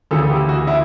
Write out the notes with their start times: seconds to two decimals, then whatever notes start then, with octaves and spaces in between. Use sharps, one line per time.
0.11 D2 C#3 E3 A4
0.29 G4
0.49 F#4
0.67 E4